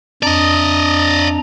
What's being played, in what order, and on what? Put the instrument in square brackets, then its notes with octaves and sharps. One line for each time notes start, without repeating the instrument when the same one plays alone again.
[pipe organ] F2 D4 A#5 [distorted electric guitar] D5 D#5